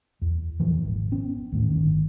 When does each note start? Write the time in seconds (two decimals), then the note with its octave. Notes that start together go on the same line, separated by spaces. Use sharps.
0.22 E2
0.60 E2 A#2 E3 F3
0.85 G#1
1.12 B3 C#4
1.52 D#2 A2
1.70 G1 D#3